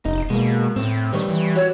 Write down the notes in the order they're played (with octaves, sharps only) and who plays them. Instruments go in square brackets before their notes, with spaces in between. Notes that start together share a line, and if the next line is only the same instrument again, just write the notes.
[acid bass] F1 [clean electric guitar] D#4
[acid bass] B2 [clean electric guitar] G#3 A#3
[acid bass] A2 [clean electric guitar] C4
[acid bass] D#3 [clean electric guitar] G3 B4 C#5
[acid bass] E3
[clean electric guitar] F#4 [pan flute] C#5